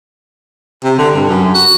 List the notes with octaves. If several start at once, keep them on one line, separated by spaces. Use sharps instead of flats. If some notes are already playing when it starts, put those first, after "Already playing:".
C3
D3
G2
F#2
F#4